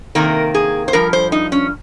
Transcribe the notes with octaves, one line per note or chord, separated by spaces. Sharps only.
C3 D#3 A#3 A#4
G#4
C5
G2 F3 A#4
C5
D#4
C#4